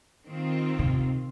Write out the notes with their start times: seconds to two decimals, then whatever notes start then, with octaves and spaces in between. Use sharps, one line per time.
0.24 D#3 C4 F4
0.79 C3